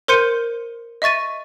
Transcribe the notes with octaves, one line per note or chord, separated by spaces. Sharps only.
A#4 C5 C6 G6 C#7 D#7
D#5 E5 C#6 A6 D#7